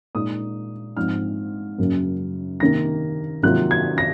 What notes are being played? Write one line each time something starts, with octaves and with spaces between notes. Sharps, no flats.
A#2 G#3 D#4 D#6
G#2 F3 C4 F6
F#2 C#3 F#3 A#3
C3 D#3 A#3 A#6
C3 D#3 F#3 A#3 F4 F#6
G#6
A#6